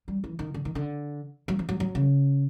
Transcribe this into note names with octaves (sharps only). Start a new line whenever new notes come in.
G3
E3
D#3
D3
D#3
D3
F#3
F3
F#3
F#3
C#3